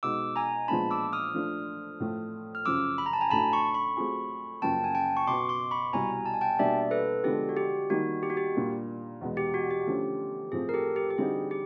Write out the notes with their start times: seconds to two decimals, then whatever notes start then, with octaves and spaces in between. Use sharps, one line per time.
0.03 B2 G#3 B3 D#4 D6 E6
0.36 G#5 A#5
0.68 A#2 F3 G#3 B3 D4 A5 B5
0.91 D6 E6
1.13 D#6 F6
1.34 F3 A3 D4
2.00 A2 F3 A3
2.55 F6
2.65 F#2 C#3 F3 D6 E6
2.98 B5
3.06 A#5
3.13 A5
3.21 G#5 A#5
3.31 A2 F#3 A3 D4 A5 B5
3.53 B5 C#6
3.74 B5 C#6
3.97 F#3 A3 C4 F4 G#4
4.62 F#2 C#3 F3 A#3 G5 A5
4.84 G#5
4.95 G5 A5
5.17 C#6
5.27 B2 F#3 B3 C6 D6
5.49 C6 D6
5.71 B5 C#6
5.93 C2 B2 G3 G#5 A#5
6.26 A5
6.34 G#5
6.41 G5 A5
6.59 B2 G3 A#3 D4 D5 E5
6.91 A4 B4
7.24 D3 F3 G#3 B3 D4 G4 A4
7.49 F#4
7.57 G4
7.90 D#3 G3 A#3 D#4 F#4
8.23 G4
8.30 F#4
8.37 G4
8.55 A#2 G3 A#3 D4
9.21 E2 B2 G#3 B3
9.37 G4
9.54 F#4
9.71 G4
9.87 D3 F3 A3 C#4
10.52 A2 F3 A3 C4 G#4
10.69 A#4
10.74 G4 A4
10.96 G4
11.10 G4
11.17 D3 G3 C4 D#4 F#4 G#4
11.51 G4